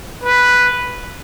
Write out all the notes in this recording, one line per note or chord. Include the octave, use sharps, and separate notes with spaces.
B4